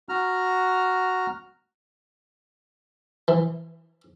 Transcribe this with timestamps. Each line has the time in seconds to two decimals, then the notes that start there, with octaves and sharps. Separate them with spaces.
0.09 F#4 A#5 F6
3.28 E3